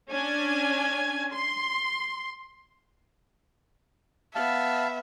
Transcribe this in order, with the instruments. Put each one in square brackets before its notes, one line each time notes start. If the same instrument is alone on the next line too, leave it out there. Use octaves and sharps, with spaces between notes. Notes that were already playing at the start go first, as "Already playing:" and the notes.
[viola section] C#4 D4 G#5
C6
[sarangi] B3 [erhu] E5 [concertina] F5 A5